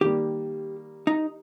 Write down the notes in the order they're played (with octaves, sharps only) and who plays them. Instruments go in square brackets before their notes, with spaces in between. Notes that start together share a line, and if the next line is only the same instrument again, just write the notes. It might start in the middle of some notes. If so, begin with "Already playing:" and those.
[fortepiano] D#3 G3 A#3 [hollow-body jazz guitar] G4
[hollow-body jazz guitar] D#4